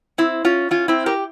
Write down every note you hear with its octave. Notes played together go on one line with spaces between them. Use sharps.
C4 E4
C#4 F4
C#4 F4
C4 E4
G4 A#4